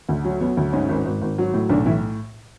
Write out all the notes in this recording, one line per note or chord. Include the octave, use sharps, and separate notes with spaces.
D2
F#3
F#3 B3
D2
G#2 C#4
G#1
G#1
G#1
F#3
A2
B1 D3 D4
A2 E3 E4